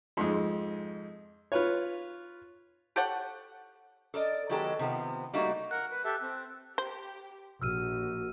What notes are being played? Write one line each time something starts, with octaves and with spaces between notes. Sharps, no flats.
F2 G#2 G#3
F4 B4 C#5
G4 A4 C#5 F#5
A4 A#4 D5 D#5
D#3 F#3 G#3 B3 G4 A4
C3 D#3 F3 B3 C4
G3 A3 A#3 D#4 F#4
A#4 F#5 F#6
B4
G4 A4 E5
C4
G4 C5
A#1 F#4 E6 F6 D#7